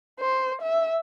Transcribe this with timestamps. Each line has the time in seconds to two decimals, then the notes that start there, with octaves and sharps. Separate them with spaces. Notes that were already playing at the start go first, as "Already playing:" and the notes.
0.20 C5
0.62 E5